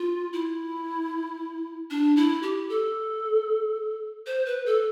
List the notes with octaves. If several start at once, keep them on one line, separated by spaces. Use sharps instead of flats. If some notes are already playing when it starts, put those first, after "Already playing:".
Already playing: F4
E4
D4
E4
G4
A4
C5
B4
A4